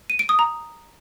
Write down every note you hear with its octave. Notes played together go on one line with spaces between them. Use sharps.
D#7
D7
D#6
A#5